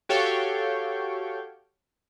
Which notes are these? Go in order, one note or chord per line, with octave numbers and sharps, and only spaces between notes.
F#4 G4 A4 C#5 F5 G5